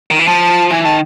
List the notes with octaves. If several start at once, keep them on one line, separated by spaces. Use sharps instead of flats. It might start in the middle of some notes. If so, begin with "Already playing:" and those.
D#3
E3
F3 A5
E3 G#5
D#3 A5